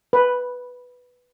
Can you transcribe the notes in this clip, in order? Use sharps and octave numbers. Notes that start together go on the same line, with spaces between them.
B4